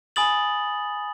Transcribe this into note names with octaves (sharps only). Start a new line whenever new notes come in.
G#5 B5 D#6 A6 F#7